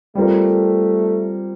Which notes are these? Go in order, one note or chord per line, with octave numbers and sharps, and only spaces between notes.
G3 A3 C4 F4 A#4